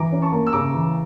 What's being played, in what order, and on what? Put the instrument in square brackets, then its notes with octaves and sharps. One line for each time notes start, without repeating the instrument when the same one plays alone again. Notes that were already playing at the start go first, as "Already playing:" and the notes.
Already playing: [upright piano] E3 [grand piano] A#5 D6
[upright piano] C#4
[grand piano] A5 C#6
[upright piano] A#3
[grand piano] E6
[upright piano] C#3 [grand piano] A#5 D6
[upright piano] E3